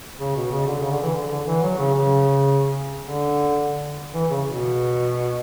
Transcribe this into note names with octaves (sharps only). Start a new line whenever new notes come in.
C#3
B2
C#3
D3
C#3
D3
E3
D3
D3
E3
F#3
C#3
C#3
D3
E3
C#3
B2